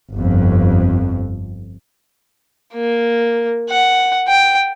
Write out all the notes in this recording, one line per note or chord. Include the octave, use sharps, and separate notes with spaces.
G1 F2
A#3
F#5
G5